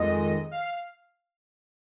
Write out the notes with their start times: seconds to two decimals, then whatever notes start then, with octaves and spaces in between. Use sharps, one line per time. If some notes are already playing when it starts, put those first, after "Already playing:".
Already playing: F2 D#3 G#3 D#5
0.51 F5